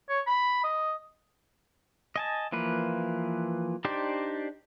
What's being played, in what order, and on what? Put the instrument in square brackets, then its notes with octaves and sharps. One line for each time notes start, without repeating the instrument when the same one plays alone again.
[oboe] C#5
B5
D#5
[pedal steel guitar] D#5 G#5 A5
E3 F3 A#3 B4
D4 D#4 G4 C5 D5